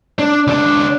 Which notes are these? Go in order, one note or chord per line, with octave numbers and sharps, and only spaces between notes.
D4
C#2 D4